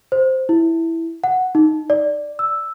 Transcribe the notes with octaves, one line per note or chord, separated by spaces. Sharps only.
C5
E4
F#5
D#4
D5
E6